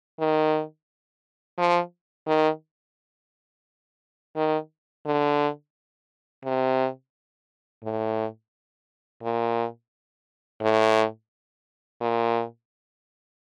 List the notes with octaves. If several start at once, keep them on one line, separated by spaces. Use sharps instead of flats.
D#3
F3
D#3
D#3
D3
C3
A2
A#2
A2
A#2